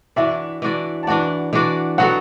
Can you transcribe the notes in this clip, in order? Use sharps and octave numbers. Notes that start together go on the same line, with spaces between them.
E3 D4 F#4 D5 E5
E3 D4 F#4 D5
A5
E3 D4 F#4 D5 F#5
E3 D4 F#4 D5
F#3 B3 F#4 A4 F#5